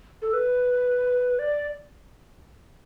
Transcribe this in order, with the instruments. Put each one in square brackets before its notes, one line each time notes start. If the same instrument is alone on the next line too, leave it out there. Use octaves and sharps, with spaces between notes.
[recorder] A4
B4
D5